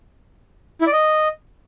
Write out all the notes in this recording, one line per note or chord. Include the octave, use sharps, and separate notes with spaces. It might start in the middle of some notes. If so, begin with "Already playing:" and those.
E4
D5
D#5